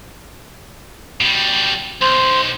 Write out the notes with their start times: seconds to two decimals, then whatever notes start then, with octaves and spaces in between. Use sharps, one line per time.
1.21 B2 G3
2.01 B1 C5